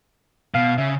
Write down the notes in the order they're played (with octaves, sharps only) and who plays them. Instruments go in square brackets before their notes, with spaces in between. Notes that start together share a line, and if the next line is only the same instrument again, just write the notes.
[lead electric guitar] B2 [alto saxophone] F5
[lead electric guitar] C#3 [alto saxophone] E5